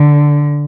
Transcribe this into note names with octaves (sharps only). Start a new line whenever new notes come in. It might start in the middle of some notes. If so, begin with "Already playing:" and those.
Already playing: D3